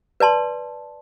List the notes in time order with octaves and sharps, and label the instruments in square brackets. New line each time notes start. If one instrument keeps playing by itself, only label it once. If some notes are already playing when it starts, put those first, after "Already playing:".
[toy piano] B4 D5 A5 C6